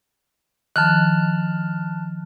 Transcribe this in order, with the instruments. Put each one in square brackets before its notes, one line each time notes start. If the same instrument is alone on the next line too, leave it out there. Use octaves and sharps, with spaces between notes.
[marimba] D#3 F3 [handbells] A5 F6 F#6